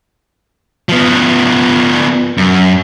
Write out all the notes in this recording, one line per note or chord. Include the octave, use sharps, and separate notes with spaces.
F3 B3
F#2